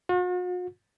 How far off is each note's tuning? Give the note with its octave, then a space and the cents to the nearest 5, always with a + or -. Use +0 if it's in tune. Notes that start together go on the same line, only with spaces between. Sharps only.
F#4 -45